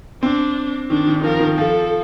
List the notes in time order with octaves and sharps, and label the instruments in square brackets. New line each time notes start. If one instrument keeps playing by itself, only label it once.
[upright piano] C4 [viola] D4
[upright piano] D#3 [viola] D4
[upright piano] D#3
[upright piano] F3 [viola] A#4
[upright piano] D#3
[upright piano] F3 [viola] A4